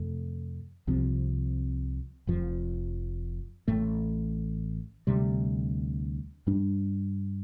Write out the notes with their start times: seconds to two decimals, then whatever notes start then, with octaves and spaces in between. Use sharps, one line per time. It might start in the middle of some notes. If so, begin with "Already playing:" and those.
Already playing: F2 C3 A3
0.87 C2 C3 F3 C4
2.27 F1 F2 F3
3.68 A1 A2 A3
5.07 D2 C3 G3
6.47 G2 G3 D4